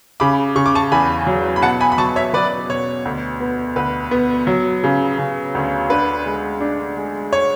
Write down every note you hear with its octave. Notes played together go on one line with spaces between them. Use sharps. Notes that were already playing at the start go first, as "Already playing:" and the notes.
C#3 B5 D6
C#3 C#6
D6
A5 C#6
E2 G#5 B5
F#3
B5
B2 F#5 A5
G#5 B5
B5
F#3 A5 C#6
C#5 E5
F#3 B4 D5
B2 C#5
D2
B3
D2 B4
B3
F#3
C#3
C#3
D2
D4 B4
G#3
D4
G#3
C#5